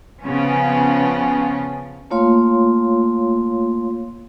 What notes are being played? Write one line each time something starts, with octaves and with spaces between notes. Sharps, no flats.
C#3 F3 B3 C#4
A3 A#3 F4 C#5 F5 C6